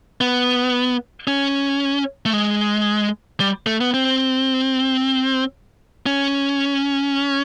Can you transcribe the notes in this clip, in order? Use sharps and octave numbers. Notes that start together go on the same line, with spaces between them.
B3
C#4
A3
G#3
G3
A3
B3
C4
C#4